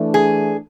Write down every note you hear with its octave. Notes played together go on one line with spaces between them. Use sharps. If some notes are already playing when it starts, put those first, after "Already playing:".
Already playing: E3 A3 D4
G#4